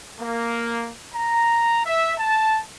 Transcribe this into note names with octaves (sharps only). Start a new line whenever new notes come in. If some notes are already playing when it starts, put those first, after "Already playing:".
A#3
A#5
E5
A5